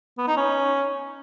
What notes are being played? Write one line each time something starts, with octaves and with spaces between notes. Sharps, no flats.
B3
D#4
C#4